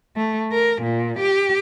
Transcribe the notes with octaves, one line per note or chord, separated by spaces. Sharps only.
A3
A#4
A#2
G4